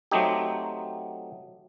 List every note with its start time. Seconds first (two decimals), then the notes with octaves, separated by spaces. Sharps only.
0.11 F#3 A3 C4 D#4 G4